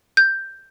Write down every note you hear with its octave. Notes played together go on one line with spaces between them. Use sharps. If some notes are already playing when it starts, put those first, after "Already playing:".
G6